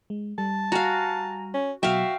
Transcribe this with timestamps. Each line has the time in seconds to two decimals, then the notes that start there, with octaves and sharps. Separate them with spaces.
0.10 G#3
0.38 G3 A5
0.72 F#4 F5 G#5 A#5
1.54 C#4
1.83 B2 F#3 F#4 E5 F5 G5